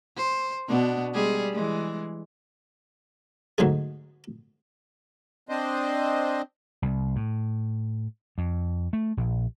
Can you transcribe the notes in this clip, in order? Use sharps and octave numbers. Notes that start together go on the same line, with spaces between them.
C5
B2 B3 D4
G3 G#3 G#4
E3 G#3
D2 G#2 F#3 G#3 D#4 G#4
C4 D4 C5 D#5
C2
A2
F2
A3
A#1